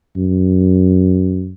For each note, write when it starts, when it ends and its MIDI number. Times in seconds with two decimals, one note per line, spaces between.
0.17 1.54 42